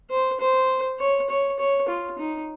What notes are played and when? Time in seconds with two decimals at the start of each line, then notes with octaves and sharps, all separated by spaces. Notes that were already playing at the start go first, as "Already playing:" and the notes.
0.11 C5
0.40 C5
1.00 C#5
1.30 C#5
1.59 C#5
1.89 F4
2.19 D#4